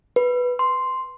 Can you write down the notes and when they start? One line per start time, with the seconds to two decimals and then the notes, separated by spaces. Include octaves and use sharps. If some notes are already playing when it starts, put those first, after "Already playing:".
0.16 B4
0.59 C6